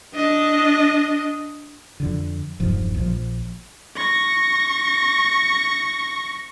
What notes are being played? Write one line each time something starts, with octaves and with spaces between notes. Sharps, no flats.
D4 D#5
F2 D3
E1 B1 G2 F3
A#1 F3
C#6 A#6